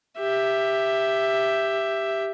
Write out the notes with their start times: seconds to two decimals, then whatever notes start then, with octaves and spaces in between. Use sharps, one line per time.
0.19 G4 E5